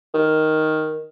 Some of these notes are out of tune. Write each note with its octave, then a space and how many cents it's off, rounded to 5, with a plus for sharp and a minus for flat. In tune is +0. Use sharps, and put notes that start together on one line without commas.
D#3 +5